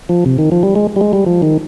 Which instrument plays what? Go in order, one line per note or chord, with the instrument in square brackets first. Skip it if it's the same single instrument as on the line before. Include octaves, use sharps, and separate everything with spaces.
[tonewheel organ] F3
C3
D#3
F3
G3
G#3
G3
G#3
G3
F3
D#3